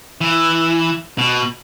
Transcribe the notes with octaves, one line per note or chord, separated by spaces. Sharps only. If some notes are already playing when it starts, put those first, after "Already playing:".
E3
B2